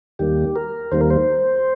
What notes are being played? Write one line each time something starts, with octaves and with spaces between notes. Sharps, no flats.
D#2 D#3 G3 A#3 G4
A#4
D#2 D#3 G3 A#3 C5
A#4
C5